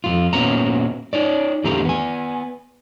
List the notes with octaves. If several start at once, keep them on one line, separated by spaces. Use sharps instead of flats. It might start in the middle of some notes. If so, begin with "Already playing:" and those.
F2 G#2 F4
A#2 B3 C#4 F#4 A#5
D#4 C#5 D5
E2 A2 D3 G4 A#5
B3 G#5